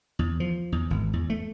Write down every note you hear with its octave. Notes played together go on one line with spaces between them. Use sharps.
E2
F3
E2
G#1
E2
A3